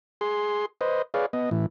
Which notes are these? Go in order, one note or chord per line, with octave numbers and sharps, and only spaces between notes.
G#4 C6
B4 C5 D#5
G#4 B4 C#5 D5 F5
B3 D#5
A2 E3